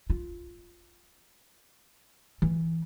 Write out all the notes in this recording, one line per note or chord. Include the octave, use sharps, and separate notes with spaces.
F4
E3